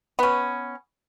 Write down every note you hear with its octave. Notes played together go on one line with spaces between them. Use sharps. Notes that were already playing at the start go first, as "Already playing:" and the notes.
B3 C#4